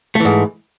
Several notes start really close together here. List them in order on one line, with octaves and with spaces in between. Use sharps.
A3 E3 G#2